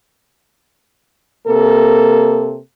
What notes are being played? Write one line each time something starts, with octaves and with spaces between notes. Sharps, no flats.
C3 A#3 A4 A#4